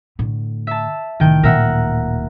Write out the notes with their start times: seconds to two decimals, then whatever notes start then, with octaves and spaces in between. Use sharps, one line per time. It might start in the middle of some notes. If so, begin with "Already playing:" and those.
0.19 A2 D3
0.67 E5 A5
1.20 C2 A2 D#3 G5
1.43 D1 A#2 A#4 E5 F#5